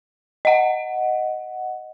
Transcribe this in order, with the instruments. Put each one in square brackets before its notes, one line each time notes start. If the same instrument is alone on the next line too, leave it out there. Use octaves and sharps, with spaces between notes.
[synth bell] D#5 F#5